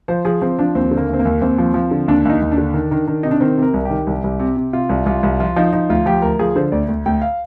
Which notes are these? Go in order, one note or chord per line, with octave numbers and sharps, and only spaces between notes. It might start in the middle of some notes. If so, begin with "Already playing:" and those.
F3 C5
F3 G#4
F3 C4
F3 D4
D#2 C4
D3
A#3
D#2 C4
A#3
D#2
D#2 C4
F3
F3
D3
D#2 D4
D#2 D#4
D#2
D4
D3
D#3
D#3
D#3
C3 D#4
D4
D#3 C4
C3
A#4
C2
D#3 G4
C2
C2
C3
C3
C3 F4
C2
C2 F4
C2
F3 F4
F3 D#4
F3 D#4
D2 F4
F3 G4
D2 A#4
F3 G#4
D3 C5
D2 D5
D2
D2 G5
F5